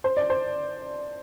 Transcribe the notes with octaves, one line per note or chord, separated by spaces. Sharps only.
C5
D5
C5